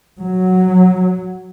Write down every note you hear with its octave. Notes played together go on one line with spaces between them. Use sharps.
F#3